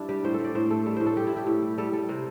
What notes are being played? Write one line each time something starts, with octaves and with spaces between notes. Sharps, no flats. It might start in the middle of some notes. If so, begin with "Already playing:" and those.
Already playing: G2 D4 E4
G3 G4
A2 C5
A4
A2 D5
A2 C5
A3 A4
G3 A4
A2 C5
A4
G3 G4
E4
A2 G4
A2
G3
G3 A4
G3 A4
C3 C5